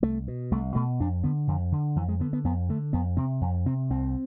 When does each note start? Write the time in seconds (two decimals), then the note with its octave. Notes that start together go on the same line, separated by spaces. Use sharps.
0.02 C2 A3
0.28 B2
0.51 C2 A3
0.75 B2 A3
1.00 F2 D4
1.24 D3 B3
1.48 F2 D3
1.72 D3
1.96 F2 E3
2.08 G#3
2.20 D3 B3
2.33 B3
2.44 F2 B3
2.69 D3 A3
2.93 F2 B3
3.17 C3 C4
3.41 F2
3.66 C3 C4
3.90 C2 C4